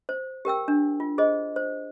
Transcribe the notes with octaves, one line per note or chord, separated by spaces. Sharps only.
C5
G4 A#4 G5 E6
D4
F4
G#4 C5 D#5
C5